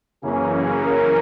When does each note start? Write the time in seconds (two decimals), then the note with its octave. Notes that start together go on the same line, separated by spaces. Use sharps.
0.22 F#2 C#3 E3 A#3 C#4 G#4
0.53 G#4
0.85 A#4